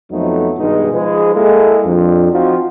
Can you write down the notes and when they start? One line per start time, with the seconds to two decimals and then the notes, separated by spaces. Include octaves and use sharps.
0.12 F2 F3 F#3 A3 B3 D#4
0.59 G2 B2 D#3 G#3 D#4
0.93 F3 G#3 D#4 G#4 B4
1.35 G#3 A#3 E4 G#4 A4
1.85 F2 F3 D4
2.32 F3 C4 D#4 F4 F#4